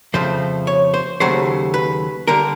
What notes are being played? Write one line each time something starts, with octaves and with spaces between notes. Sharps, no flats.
F2 C#3 F3 A3 C5
C#5
C5
D#2 C#3 F#3 A3 C5
B4
D3 G3 A#4